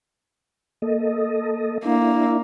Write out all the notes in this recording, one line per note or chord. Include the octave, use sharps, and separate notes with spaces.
A#3 A4 D#5
A#3 D4 E4